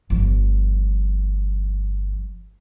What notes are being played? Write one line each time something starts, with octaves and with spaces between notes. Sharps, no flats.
G1 F3